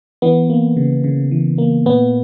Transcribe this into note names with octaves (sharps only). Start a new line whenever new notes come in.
E3 B3
A#3
C#3
C#3
E3
A#3
A#2 B3